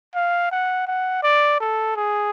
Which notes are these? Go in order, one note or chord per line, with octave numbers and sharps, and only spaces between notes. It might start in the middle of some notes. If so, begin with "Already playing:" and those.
F5
F#5
F#5
D5
A4
G#4